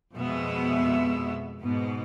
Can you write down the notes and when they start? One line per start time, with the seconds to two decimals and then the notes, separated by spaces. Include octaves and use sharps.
0.16 F2 B2 G#3 B3 E5
1.62 G#2 B2 B3